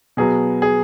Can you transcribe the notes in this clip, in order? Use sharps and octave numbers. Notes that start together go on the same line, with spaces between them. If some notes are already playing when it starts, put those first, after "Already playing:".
B2 F#3 B3 G#4
G#4